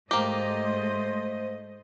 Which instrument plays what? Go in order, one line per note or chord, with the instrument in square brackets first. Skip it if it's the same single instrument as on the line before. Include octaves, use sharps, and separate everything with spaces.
[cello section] G#2 A3 D#5 [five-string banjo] A#3 G4 [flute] C5